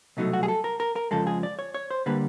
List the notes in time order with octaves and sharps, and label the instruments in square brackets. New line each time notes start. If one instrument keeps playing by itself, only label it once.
[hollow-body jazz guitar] C2 B2 F#3 A3 D#4
F#4
G#4
A4
A#4
A#4
A#4
F2 C#3 F3 G#3 A4
G#4
D5
C#5
C#5
C5
D3 G3 A#3 B4